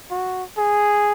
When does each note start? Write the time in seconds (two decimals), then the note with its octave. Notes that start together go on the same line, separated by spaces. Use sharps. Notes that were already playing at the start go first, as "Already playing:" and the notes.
0.11 F#4
0.57 G#4